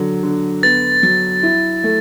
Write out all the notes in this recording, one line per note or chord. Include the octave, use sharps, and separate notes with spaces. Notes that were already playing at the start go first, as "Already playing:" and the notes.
Already playing: D3 F#3
D3
B3 A6
F#3
E4
A3